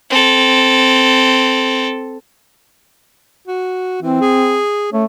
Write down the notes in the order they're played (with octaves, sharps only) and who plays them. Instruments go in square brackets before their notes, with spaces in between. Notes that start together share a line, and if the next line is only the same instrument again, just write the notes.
[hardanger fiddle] C4 A4
[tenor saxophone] F#4
[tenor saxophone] E3 [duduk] C4
[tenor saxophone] G#4
[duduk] A3 [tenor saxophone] C#4